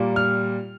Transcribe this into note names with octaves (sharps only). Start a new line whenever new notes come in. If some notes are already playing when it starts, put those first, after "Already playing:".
Already playing: A#2 G3 A#3
F6